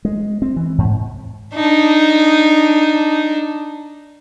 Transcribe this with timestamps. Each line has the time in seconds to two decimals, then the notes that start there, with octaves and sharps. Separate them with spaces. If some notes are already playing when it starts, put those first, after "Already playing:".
0.05 G#3
0.42 C4
0.56 E3
0.78 G#2
1.54 D4 D#4